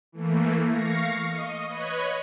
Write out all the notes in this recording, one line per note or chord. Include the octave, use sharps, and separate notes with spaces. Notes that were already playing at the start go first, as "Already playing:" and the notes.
E3 A3 A#3
F5 C#6 A#6
D#5
B4 C#5 D#5 F#6 G#6